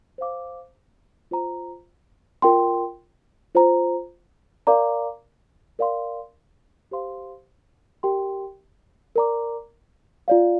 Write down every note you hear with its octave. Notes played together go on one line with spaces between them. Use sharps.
C5 F5 D6
F4 C5 A#5
F4 A#4 G5 C6
F4 C5 A#5
A#4 D5 F5 A#5 D6
A#4 D5 F5 C6
G4 C5 F5 C6
G4 A#4 G5 C6
A#4 D5 A#5 D6
F4 D5 F5